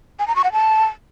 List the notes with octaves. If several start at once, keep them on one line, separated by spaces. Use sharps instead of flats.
G#5
A#5
C#6
F#5
A5